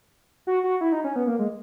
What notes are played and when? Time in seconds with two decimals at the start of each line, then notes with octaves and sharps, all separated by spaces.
0.47 F#4
0.64 F#4
0.81 E4
0.92 D#4
1.04 C#4
1.16 B3
1.27 A#3
1.39 G#3